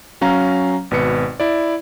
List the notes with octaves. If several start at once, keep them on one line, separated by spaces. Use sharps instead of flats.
F#3 C#4 F5 A#5
G#1 B2 B4 C#7
E4 D5